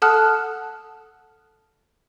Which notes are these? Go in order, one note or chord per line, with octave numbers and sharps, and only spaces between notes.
A4 F#5 A5 D#6 F6 F#6